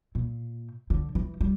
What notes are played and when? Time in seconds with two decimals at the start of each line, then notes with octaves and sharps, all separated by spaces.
0.15 A#2
0.90 D3
1.15 E3
1.41 G3